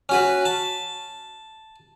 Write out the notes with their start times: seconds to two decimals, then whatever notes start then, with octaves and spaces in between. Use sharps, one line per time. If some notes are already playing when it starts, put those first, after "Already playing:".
0.09 C#4 F#4 B4
0.45 A5